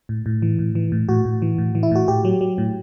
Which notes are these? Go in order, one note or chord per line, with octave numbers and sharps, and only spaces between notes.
A2
A2
E3
A2
E3
A2
A2 F#4
A2
E3
A2
E3
E4
A2 F#4
A2 G4
F#3
F#3
A2